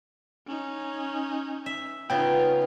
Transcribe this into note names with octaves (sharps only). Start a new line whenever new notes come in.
C#4 D#4
E5
C#3 B3 D#4 F4 G5